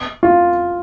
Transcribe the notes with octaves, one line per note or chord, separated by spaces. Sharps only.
F4